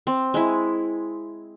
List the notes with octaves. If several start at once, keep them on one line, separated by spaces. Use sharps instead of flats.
C4
G#3 E4